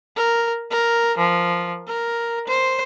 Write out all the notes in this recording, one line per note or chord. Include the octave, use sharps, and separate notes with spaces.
A#4
A#4
F3
A#4
C5